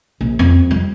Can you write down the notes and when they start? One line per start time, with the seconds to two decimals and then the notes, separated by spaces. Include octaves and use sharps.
0.21 A#1
0.39 F2
0.71 G3